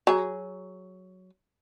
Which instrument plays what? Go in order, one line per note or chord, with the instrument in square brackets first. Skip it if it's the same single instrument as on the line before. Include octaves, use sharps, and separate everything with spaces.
[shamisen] F#3 G#4